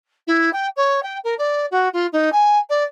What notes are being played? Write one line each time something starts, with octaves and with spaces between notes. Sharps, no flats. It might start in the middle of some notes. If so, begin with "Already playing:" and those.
E4
G5
C#5
G5
A#4
D5
F#4
F4
D#4
G#5
D5